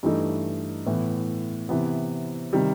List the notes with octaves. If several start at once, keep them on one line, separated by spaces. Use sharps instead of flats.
G2 E3 A3 D#4
A2 E3 B3
C3 E3 B3
C3 D#3 G3